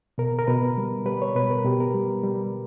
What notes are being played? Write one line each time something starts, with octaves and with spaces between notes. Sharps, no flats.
B2 A#4
A#4
B2 B4
G3
G3 B4
C#5
B2 B4
A#4
B2 G4
A#4
G3
G3